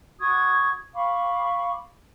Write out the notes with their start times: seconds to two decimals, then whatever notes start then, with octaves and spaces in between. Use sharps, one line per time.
0.20 F#4 C#6 D#6 G#6
0.94 F5 B5 C#6 D6